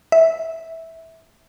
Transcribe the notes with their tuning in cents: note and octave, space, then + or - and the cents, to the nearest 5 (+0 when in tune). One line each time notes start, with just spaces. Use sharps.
E5 -15